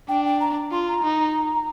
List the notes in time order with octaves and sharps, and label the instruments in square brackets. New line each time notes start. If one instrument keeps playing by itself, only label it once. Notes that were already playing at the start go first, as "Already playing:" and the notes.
[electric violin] D4 [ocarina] G5
[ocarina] G5
A#5
[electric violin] F4 [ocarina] C6
[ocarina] A#5
[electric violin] D#4